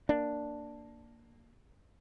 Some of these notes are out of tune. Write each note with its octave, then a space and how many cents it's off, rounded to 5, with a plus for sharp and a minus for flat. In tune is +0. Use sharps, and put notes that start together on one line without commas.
A#3 +0 D4 +0